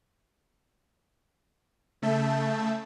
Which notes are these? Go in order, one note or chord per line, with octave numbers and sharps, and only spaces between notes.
C#3 A3 E5 A5 G6